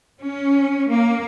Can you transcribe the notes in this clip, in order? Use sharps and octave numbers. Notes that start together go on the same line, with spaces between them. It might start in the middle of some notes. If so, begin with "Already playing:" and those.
C#4
A#3